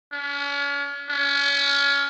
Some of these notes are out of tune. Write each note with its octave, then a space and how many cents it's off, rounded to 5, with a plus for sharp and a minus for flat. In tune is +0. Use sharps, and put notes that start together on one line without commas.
C#4 +40
C#4 +30